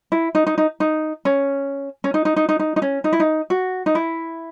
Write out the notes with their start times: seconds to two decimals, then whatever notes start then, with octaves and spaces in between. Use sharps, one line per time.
0.12 E4
0.35 D#4
0.47 D#4
0.58 D#4
0.80 D#4
1.25 C#4
2.04 C#4
2.14 D#4
2.25 D#4
2.36 D#4
2.49 D#4
2.59 D#4
2.76 D#4
2.82 C#4
3.04 D#4
3.13 E4
3.20 D#4
3.50 F#4
3.86 D#4
3.95 E4